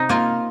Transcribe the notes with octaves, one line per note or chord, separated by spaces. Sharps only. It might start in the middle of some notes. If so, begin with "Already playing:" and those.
Already playing: C3 D#4
A#3 F4